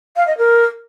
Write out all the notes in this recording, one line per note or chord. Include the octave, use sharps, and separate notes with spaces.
F5
D#5
A#4